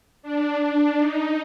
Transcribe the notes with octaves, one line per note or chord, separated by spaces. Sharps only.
D4
D4
D#4